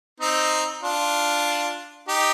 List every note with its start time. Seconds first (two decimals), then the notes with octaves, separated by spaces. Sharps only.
0.20 C4 D#4
0.83 D4 F4
2.08 D#4 G4